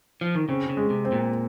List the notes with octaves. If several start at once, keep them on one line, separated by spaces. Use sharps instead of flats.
F3
D#3
C#3 C4
C#3
G#3
C3
C4
A#2